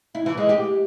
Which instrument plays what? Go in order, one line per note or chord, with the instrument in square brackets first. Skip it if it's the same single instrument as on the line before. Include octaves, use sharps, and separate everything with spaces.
[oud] E4
E3
G#3
G4